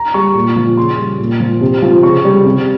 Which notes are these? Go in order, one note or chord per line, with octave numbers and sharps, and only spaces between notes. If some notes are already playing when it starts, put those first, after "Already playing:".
Already playing: A#5
G3 C#6
A#2
F3
C#3 C6
G3
A#2
F3
C3
F3
C#3 C#6
G3
C3